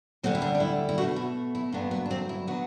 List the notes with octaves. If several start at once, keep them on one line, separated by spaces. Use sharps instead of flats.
D2 D3 G3 C4
E4
D4
D4
E4
E4
B2 A3 F#4
E4
E4
G2 D3 F#3 B3 D4
B3
D4
C4
E4
F#3 B3 F#4